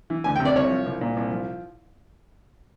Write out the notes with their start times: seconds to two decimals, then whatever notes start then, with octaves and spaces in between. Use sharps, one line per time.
0.10 E3
0.24 D2 G#5
0.36 G5
0.40 C3
0.45 D5
0.55 C2 C#5
0.70 F3
0.86 C2
1.01 A#2
1.17 C2
1.31 F3